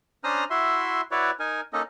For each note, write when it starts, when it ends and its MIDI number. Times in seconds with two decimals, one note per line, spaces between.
0.24 0.44 61
0.24 0.44 62
0.24 0.44 72
0.24 0.44 82
0.24 0.44 87
0.24 0.44 89
0.50 1.01 64
0.50 1.01 66
0.50 1.01 76
0.50 1.01 84
1.11 1.31 64
1.11 1.31 66
1.11 1.31 71
1.11 1.31 73
1.11 1.31 74
1.40 1.61 63
1.40 1.61 70
1.40 1.61 80
1.73 1.82 58
1.73 1.82 61
1.73 1.82 63
1.73 1.82 69
1.73 1.82 75